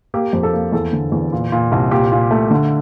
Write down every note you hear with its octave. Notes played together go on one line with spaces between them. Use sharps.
A#3 G4
F2
A4
A#3
E2 A4
D3
E2
A#2
A#2
C2
A#2 G4
A#2
A3
D3